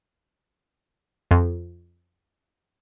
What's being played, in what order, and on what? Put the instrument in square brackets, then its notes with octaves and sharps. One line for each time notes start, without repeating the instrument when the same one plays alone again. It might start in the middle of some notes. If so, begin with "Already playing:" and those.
[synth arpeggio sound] F2